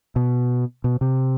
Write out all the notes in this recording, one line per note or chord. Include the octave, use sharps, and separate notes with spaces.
B2
B2
C3